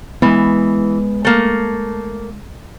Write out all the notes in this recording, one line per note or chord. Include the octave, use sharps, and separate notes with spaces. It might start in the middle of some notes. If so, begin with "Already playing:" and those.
E3 G#3 B3
A3 A#3